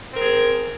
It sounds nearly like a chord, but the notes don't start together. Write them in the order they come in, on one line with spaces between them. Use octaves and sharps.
C4 A#4 G#4